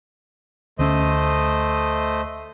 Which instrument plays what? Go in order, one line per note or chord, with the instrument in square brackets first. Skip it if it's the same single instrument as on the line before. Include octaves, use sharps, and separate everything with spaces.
[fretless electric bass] D2 C#4 [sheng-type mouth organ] A3 C5 D#5